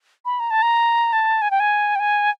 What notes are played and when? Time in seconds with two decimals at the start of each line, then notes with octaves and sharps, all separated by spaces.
0.25 B5
0.40 A#5
0.51 A5
0.62 A#5
1.13 A5
1.42 G#5
1.51 G5
1.60 G#5
1.96 G5
2.00 G#5